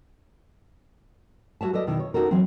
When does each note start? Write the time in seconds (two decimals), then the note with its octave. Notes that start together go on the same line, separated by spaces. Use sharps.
1.61 G3 F#4 C#5 E5 A5
1.73 A4 B4 D5 D#5
1.87 B2 D#3 E4
1.99 C#5
2.14 C#4 D#4 F#4 A4 A#4
2.31 E3 F#3 C4